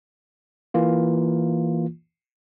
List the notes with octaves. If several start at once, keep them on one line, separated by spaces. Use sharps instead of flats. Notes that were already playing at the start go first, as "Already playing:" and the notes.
E3 A#3 F4